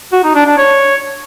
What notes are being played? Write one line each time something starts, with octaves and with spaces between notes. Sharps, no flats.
F#4
D#4
D4
D4
C#5